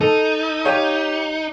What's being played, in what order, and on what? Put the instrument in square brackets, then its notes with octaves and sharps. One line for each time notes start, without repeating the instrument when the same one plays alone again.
[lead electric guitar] D#4 [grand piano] A4
[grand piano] G4 C#5 F5